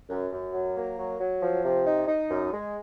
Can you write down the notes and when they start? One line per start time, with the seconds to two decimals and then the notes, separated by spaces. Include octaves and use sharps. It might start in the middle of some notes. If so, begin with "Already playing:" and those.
0.10 F#2
0.32 F#2
0.53 F#3
0.76 A#3
0.97 F#3
1.20 F#3
1.42 F3
1.64 C3
1.86 D#4
2.07 D#4
2.30 F#2
2.52 G#3